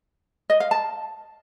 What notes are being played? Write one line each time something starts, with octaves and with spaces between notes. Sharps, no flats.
D#5
F5
A5